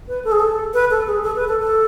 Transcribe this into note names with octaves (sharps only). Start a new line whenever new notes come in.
B4
A4
G#4
A4
B4
A4
G#4
A4
B4
A4
A4